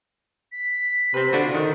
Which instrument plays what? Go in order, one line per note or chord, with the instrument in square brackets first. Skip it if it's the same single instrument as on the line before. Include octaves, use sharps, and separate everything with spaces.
[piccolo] B6
[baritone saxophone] C3 [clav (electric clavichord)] C4 B4
[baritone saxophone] D3 [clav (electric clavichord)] D4 F4 F#4
[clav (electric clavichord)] D#3